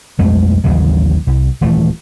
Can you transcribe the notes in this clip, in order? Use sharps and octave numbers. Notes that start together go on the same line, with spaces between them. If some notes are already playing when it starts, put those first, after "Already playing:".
B1 F2 G#3 A3
A1 D#2 C#3 F#3
C2
D#1 E3 A3